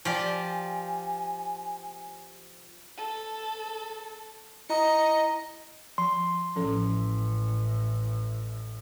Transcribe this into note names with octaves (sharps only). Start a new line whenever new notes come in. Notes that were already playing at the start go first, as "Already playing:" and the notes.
F3 G4 D5 G#5
A4
E4 D#5 A#5 C#7
F3 C6
A1 A2 F3 C#4 A4